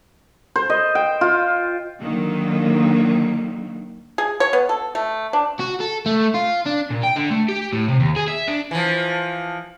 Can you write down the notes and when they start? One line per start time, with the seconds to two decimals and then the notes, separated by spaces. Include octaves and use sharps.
0.56 C5
0.70 D#5
0.95 G5
1.21 F4
2.02 D3 D#3 F#3 A#3
4.18 G#4
4.40 C#5
4.53 B3
4.69 A4
4.95 A3
5.33 D4
5.60 F#4
5.81 A4
6.06 A3
6.34 F4
6.66 D4
6.91 A#2
7.04 G5
7.16 D3
7.31 A3
7.49 G4
7.73 A2
7.88 C3
8.00 D#2
8.16 G#4
8.28 E5
8.48 D4
8.71 E3 F3